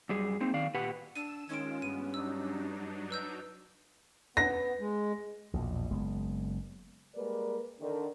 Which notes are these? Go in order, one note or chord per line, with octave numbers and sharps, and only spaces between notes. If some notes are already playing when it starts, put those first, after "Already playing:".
F#2 G3 G#4
A#3 C4 D#4
D#3 D5 F5
A#2 G4 B4 F#5
D4 E6 D#7 E7
D#3 G#3 C#4 F4 G#6 D7
G2 B3 D#7
F#3 D4 D#4 E6
B4 E6 G6
B3 A#6
G#3
A#1 E2 B2
F#1 G#3 B3
G3 G#3 A#3 A#4 B4 D5
D3 D#3 D4